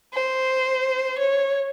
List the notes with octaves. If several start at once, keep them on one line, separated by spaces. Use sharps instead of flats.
C5
C#5